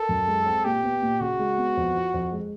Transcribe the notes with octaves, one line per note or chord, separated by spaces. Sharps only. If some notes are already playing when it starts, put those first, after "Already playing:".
Already playing: A4 A#4
F#2
G#3
C4
A#2 G4
B3
A#2
C#3 F#4
G#3
B3
F2
F3
F2
G#3